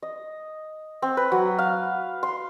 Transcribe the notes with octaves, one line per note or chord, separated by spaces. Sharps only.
D#5
C4
B4
F#3
F5
C6